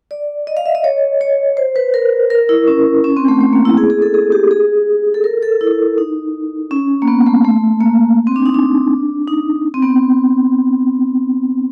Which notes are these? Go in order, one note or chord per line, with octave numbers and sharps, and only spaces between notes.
D5
D#5
F5
E5
D#5
C#5
C#5
C5
B4
A#4
A#4
E4
C#4
C#4
C4
A3
A3
A#3
E4
G#4
G#4
A4
G#4
G4
G#4
A4
A#4
A4
E4
D#4
C#4
A#3
B3
A3
A3
A#3
C4
D4
D#4
D4
D#4
C4
B3